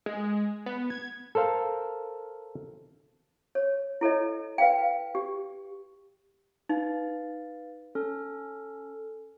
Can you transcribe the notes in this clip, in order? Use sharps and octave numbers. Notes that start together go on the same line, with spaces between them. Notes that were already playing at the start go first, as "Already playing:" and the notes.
G#3
B3
G#6
A4 A#4 C5 F5
C#5
E4 A4 C#5 D#5
B4 F5 G5
G4
D#4 B4 F5 A6
C#4 A4 F6